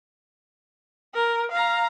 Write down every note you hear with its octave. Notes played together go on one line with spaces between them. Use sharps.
A#4
F5 A#5